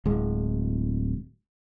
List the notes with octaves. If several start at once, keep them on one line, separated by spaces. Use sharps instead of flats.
D1 G#3